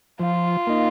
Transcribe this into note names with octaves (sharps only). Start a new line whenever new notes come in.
F3 F4
A#3 D#4